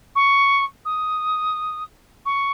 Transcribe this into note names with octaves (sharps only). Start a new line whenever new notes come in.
C#6
D#6
C#6